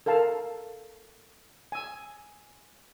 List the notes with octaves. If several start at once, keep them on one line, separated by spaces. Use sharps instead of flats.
A4 A#4 F5 A5
G#5 E6